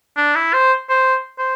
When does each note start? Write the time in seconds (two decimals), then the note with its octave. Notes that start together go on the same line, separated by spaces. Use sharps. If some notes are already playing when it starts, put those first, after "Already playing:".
0.17 D4
0.35 E4
0.54 C5
0.90 C5
1.39 C5